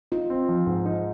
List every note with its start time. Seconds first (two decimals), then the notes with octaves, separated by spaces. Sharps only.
0.12 D#4 F4
0.30 C4
0.49 F3
0.67 G#2
0.86 D#4